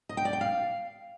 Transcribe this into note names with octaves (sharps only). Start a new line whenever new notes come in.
D#5
G5
D5
G5
F5